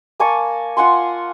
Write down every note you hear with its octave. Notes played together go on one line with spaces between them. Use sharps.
A#3 G#5 A5 C#6
F4 F#5 G#5 C6